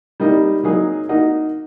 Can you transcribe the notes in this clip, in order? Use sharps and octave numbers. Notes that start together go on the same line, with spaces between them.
G3 A#3 D#4
F#3 A#3 D#4 G#4
A#3 D#4 F#4